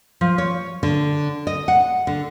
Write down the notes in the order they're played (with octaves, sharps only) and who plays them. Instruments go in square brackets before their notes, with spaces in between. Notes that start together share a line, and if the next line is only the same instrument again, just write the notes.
[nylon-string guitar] F3
C#5
D3
D#5
F#5
D3